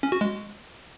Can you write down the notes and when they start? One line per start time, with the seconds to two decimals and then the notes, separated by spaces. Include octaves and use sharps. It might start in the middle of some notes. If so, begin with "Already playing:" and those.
0.03 C#4
0.12 F#4
0.21 G#3